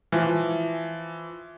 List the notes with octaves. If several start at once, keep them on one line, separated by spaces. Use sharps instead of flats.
E3 F3